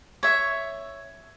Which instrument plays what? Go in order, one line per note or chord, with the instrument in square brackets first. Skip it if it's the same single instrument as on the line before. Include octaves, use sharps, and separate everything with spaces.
[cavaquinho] C#5 E5